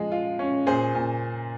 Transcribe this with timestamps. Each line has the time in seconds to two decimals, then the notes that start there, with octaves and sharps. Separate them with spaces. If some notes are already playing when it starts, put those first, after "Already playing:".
Already playing: F3 G#3
0.12 F4
0.39 C#4
0.67 A#2 G#4 C5
0.95 A#2